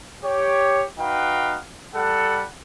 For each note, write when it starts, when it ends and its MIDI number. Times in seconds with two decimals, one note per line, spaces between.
0.24 0.84 67
0.24 0.84 73
0.99 1.57 63
0.99 1.57 66
0.99 1.57 71
0.99 1.57 77
0.99 1.57 79
1.94 2.43 55
1.94 2.43 69
1.94 2.43 78